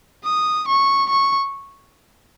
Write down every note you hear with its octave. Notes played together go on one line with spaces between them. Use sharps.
D#6
C#6
C#6